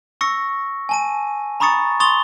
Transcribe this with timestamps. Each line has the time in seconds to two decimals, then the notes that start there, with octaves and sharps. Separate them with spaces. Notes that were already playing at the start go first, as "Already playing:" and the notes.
0.21 C#6 E6 A#6 C#7
0.89 G#5 A5 D#7
1.60 A#5 B5 C#6 D#6 A6 C#7
2.00 C6 C#6 D#6 A6 F7 G7